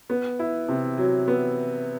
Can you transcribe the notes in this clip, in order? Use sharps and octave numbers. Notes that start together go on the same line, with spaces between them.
B3
E4
C3
F#3
B3